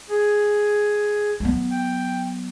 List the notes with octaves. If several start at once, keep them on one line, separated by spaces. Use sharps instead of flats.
G#4
F#3 B3
G5